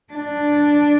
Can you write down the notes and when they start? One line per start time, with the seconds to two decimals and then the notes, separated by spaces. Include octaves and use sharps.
0.13 D4